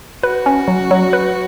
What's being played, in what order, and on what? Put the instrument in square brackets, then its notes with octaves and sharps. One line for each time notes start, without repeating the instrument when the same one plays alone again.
[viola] F#4 [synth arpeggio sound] B4
[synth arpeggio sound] C#4
F#3
F#3
B4